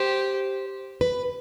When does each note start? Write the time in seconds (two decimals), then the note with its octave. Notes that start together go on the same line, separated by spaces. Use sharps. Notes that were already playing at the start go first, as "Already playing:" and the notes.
Already playing: G4 C5
1.01 B4